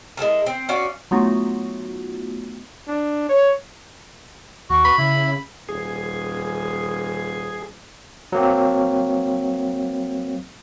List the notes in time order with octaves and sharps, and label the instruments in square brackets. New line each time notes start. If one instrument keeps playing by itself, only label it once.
[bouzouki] G#3 E4 A4 A#4
C4
C#4 F4 F#4 D5
[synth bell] F#3 A3 B3 D#4 F4 F#4
[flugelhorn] D4
C#5
[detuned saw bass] D#2 [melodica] F#4
[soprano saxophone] B5
[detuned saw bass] C#3 [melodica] E4
[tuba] D#1 [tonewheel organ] G#4
[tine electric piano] F#3 A#3 C4